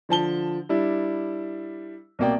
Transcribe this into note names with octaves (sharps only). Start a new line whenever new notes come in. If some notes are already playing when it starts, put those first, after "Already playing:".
D3 F3 A5 G7
G3 D4 E4
C2 B2 A#3 D5 G5